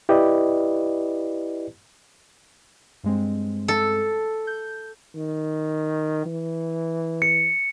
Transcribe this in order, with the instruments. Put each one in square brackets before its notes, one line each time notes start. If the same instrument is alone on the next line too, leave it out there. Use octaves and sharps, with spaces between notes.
[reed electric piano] E4 G4 B4 D5 D#5
[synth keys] G2 G#3 C4
[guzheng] A4
[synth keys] G6
[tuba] D#3
E3
[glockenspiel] C#7